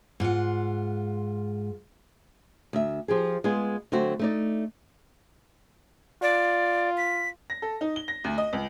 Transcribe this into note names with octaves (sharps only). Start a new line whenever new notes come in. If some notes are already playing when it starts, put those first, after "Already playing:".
G#2 F4 B4 F#5
D2 E5
F3 G4 G#4
G#3 B3 F4 G#4
D3 F#3 A3 C4 F#4
A3 D#4 D5
F4 D5
B6
A#6
A4
D#4
G7
A#6
D2
D#5
C#2